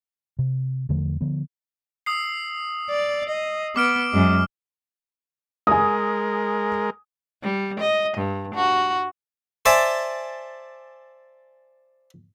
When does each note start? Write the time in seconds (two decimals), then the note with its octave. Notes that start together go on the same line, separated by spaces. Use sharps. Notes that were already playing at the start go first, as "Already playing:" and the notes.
0.39 C3
0.89 E2 D3 F3 A3
1.21 D3 F3 B3
2.06 D#6 E6 C7
2.90 D5
3.29 D#5
3.76 B3 D6 F6 D7
4.12 F#2 G#3
5.67 G#3 A#4 G#5 D#6
7.43 G3
7.80 D#5
8.17 G2
8.55 F#4
9.65 C5 D5 E5 G#5 A5